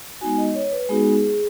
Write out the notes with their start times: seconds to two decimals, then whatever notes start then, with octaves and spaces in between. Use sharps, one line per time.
0.21 G#3 B3 D#4 F#4 G#5
0.38 D#5
0.55 C#5
0.72 B4
0.89 G#3 B3 D#4 F#4 G#4